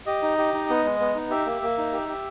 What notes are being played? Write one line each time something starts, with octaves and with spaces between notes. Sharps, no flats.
G4 D#5
D#4
G4
D#4
B3
G#3
B3
D#4
G4 E5
A#3
A#3
D#4
G4
G4